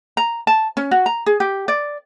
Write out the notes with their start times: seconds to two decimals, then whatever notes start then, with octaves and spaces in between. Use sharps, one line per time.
0.17 A#5
0.47 A5
0.77 C#4
0.91 F#4
1.06 A#5
1.26 G#4
1.40 G4
1.68 D5